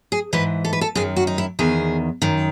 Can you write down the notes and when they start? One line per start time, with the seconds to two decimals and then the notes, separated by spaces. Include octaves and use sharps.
0.12 G#4
0.33 G#2 E3 B4
0.65 A4
0.73 B4
0.81 A4
0.95 F#2 D#3 G#4
1.16 F#4
1.27 D#4
1.38 E4
1.59 E2 D#3 G#4
2.22 F#2 D#3